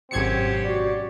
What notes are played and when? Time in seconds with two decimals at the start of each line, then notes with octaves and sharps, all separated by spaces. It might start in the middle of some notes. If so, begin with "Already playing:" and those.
0.11 G#1 F#2 B2 C4 G4 G#6 C#7
0.65 F#4 D5